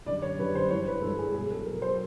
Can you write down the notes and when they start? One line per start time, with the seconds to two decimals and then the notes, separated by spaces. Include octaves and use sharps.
0.06 F#2 D3 G3 D5
0.22 C#5
0.39 F#2 D3 G3 B4
0.55 C5
0.70 G2 E3 G#3 C#5
0.87 B4
1.02 G2 E3 G#3 A4
1.19 G#4
1.34 B2 F#3 G#4
1.50 A4
1.66 B2 F#3 A#4
1.82 C5